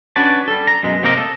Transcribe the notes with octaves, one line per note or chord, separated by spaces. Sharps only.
C#4 D4 F#4 B4 D5 A5
G3 A4
A#5
F#2 B2 G#3
C3 A#3 C4 G4 A#4 D#5
A4